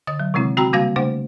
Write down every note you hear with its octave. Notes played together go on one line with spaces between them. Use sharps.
D3 D#5 A6
F#3
C3 D#3 G#3 C4 E4
C4 F#4 G5 A#5 B5 E6
C#3 G3 A#3 F#4 F5 G#6
C#3 A3 D4 C5 F#5